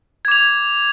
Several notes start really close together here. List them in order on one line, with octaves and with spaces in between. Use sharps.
G#6 D6 F7